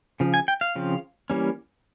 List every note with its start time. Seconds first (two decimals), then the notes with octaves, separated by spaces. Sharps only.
0.20 C#3 F3
0.34 G#5
0.48 G5
0.61 F5
0.76 C#3 F3 C4
1.30 E3 G3 A#3 C#4